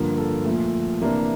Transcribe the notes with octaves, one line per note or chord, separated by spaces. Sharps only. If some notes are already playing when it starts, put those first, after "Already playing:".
Already playing: G2 D3 F3 A#3
A4
A#2 F3 A3
C3 E3 A#3 D4 A#4